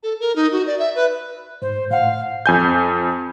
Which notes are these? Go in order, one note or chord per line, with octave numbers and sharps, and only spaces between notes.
A4
A#4
D#4
F#4
D5
E5
B4
G#2 C5
A2 F5 F#5
F2 G#5 G6